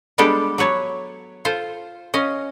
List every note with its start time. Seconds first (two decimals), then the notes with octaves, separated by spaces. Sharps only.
0.18 G3 G#3 B3 D4 G4 A4
0.58 F#3 B4 C#5 A5
1.45 F4 A4 C5
2.14 C#4 D#5 F5